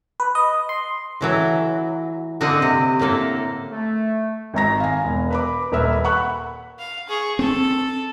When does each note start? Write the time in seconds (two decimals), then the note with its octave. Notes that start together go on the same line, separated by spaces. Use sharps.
0.20 B4
0.35 D#5
0.69 C6
1.21 A2 E3 F#3
2.41 D3 A#3 C4 D#5 F#5
2.62 C3
2.99 A2 D3 A#3 A4
3.71 A3
4.54 G#1 D#3 A#5 A#6
4.80 F5 G#5
5.04 E1
5.30 B4 B5 D6
5.72 D#1 A#4 B4 E5
6.04 F#5 B5 C#6 F#6
6.79 F5
7.08 G#4 C#6
7.39 C4 A4